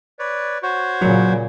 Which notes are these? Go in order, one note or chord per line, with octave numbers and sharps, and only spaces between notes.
B4 C#5 D5
F#4 C5 C#5
A#2 C#3 F#3